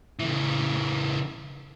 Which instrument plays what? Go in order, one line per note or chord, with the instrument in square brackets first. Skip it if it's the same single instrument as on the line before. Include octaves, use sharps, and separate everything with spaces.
[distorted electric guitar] C#3 E3